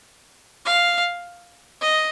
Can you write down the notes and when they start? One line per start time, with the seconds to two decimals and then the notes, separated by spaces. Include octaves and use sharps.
0.65 F5
1.81 D#5